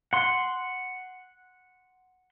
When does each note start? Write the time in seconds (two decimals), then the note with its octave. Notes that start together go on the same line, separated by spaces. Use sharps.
0.13 F#5 C6